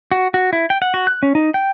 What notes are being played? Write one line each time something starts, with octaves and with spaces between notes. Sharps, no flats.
F#4
F#4
E4
G5
F#5
F#4
F#6
C#4
D#4
G5